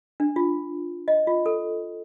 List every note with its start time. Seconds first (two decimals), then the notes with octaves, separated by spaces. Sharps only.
0.20 D4
0.36 F4
1.08 D#5
1.27 F4
1.46 A4